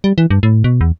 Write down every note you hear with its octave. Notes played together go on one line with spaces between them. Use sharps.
G3
E3
G2
A2
B2
E2